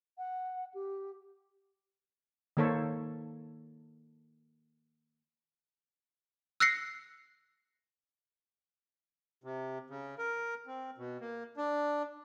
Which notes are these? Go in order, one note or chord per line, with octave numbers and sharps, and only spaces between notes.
F#5
G4
D#3 A#3 A4 C5 C#5
E6 F#6 A#6 C7 C#7
C3
C#3
A#4
C4
B2
A#3
D4